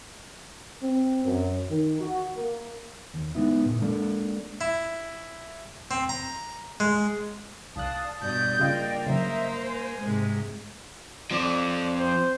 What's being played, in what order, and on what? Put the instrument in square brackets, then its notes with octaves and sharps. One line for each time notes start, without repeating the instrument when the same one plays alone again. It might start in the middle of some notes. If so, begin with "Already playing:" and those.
[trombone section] C4
F#2
D#3
F#4
A#3
[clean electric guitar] D#2
G#3 B3 D#4 E4
A#2
G#3 A#3 D4 A4 A#4
[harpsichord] E4
C4
A#5
G#3
[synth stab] C2 F#6 [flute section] D5 F5 D#6 [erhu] A5
[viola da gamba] G2 B2 [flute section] D5 D#6 [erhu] G6
[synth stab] C#3 F4 [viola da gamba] A#3 [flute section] D5 D#5 G5
[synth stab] C#3 F#3 [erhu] C5 [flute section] D#5 E5 A#5
[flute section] G#5
[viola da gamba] G#2 C3 G#3
[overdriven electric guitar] F3 C4 [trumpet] D5
[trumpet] C5